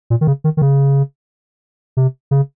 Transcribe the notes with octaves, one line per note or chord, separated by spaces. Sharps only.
A#2
D#3
C#3
D#3
D#3
C#3
C3
C#3